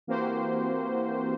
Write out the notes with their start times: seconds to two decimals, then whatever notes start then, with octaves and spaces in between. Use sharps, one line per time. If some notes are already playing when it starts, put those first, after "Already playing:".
0.07 E3 A#3 C4 F#4 G4 C5